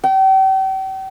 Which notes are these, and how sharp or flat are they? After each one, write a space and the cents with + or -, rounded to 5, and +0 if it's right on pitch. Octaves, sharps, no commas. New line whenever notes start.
G5 -40